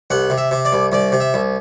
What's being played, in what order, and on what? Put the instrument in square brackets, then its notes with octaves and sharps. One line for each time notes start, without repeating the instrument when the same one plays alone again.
[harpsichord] C2 F#5
C3
E5
C3
D5
C2
C2 D5
C3
E5
C2